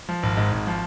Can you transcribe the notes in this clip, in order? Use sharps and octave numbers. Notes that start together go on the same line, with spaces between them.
F3
G#1
G#2
G#1
F3